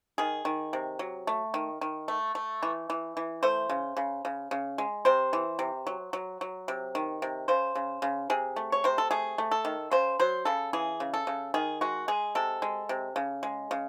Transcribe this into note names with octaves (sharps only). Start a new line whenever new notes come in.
D#3 G#4
D#3
C3
F#3
A3
D#3
D#3
A3
A3
E3
E3
E3
A3 C5
C#3
C#3
C#3
C#3
G#3
C3 C5
E3
C3
F#3
F#3
F#3
C3
D#3
C3
C#3 C5
C#3
C#3
C3 G#4
A3
C#5
C3 C5
A4
A3 G#4
A3
A4
D#3
C#3 C5
F#3 C5
C#3 A4
E3 G#4
C#3
A4
C#3
D#3 G#4
G#3 F#4
G#3 G#4
C3 A4
G#3
C3
C#3
G#3
C#3